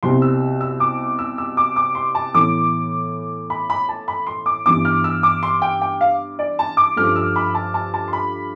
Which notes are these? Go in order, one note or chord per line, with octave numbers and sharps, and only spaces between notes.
C2 B2 G3 C4 C6
E6
E6
D6
E6
E6
D6
D6
C6
A5
A2 E3 B3 D6
B5
B5
A5
B5
C6
D6
G2 E3 B3 D6
F6
E6
D6
C6
G5
G5
F5
D5
A5
D6
G2 F3 A3 F6
E6
B5
A5
A5
A5
C6
B5